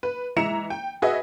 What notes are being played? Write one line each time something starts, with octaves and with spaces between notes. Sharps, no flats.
B4
E3 G#3 E5 A#5 C#7 E7
G5
F#4 G#4 B4 D#5 E5